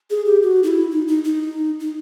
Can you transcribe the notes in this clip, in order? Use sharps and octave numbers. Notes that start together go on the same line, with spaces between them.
G#4
G4
F#4
D#4
E4
D#4
D#4
D#4
D#4